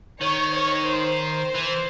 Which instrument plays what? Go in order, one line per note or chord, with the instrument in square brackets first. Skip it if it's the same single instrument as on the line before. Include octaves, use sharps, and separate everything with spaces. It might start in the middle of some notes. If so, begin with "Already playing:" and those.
[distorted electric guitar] D#3 [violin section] C#5
[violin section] C#5
C5
[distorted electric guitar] E3